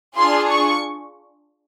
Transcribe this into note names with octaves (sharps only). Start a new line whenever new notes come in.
D4 F4 G#4 C6
C#6